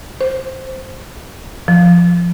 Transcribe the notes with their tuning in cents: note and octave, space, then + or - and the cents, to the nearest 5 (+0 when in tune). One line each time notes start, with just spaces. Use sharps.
C5 +0
F3 -5